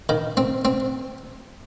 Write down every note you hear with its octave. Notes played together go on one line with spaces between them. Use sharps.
D#3
C4
C4